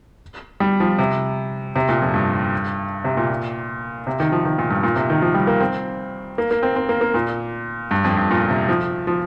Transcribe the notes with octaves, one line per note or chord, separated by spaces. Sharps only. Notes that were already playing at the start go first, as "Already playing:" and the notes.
G3
F3
C3
C3
A#2
F2
G2
C3
A#2
C3
D#3
F3
D#3
A#2
G2
A#2
C3
D#3
F3
G3
A#3
C4
A#3
A#3
C4
C4
A#3
A#3
A#2
G2
F2
G2
A#2
C3
F3
F3